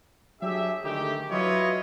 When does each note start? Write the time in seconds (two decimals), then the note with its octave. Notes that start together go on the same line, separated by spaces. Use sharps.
0.42 F#3 D4 G4 G#4 E5
0.84 D3 D#3 G#3 A3 G4
1.32 F#3 E4 F4 B4 C#5 D#5